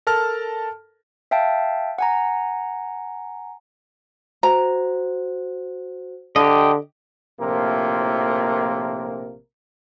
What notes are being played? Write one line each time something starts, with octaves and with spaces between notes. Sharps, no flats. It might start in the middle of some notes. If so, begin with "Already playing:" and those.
A4 A#4 A5 F6
E5 F5 G5 A5
F#5 G#5 A#5
F#4 C5 A#5
D3 G4 D#5
A#1 A2 C3 F3 A#3 A#4